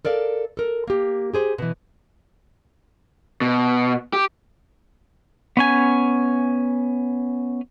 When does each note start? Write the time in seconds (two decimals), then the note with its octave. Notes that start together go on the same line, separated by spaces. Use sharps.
0.05 A4 A#4 D5 F5
0.57 A4 A#4
0.87 A#3 G4
1.34 G4 G#4 C5
1.58 B2 E3
3.41 B2
4.13 G4
5.57 B3 C#4 G#5